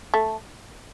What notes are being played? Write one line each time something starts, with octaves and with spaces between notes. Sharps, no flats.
A3